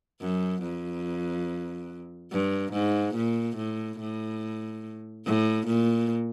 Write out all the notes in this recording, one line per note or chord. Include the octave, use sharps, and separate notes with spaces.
F#2
F2
G2
G#2
A#2
A2
A2
A2
A#2